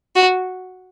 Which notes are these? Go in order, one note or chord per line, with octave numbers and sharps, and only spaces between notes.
F#4